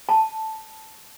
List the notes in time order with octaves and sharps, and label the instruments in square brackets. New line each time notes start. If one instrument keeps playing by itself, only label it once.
[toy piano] A5